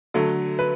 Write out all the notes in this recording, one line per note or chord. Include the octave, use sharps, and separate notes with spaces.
D3 F#3 A3
B4